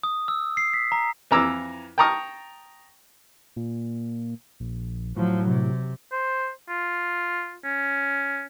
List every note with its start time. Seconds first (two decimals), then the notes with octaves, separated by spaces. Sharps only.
0.03 D#6
0.28 E6
0.57 C7
0.74 B6
0.92 A#5
1.31 F2 E3 A#5 D6 E6
1.98 G5 A5 A#5 C#6 D#6
3.56 A#2
4.60 A#1
5.16 A2 F3 F#3
5.49 C3
6.12 C5
6.69 F4
7.64 C#4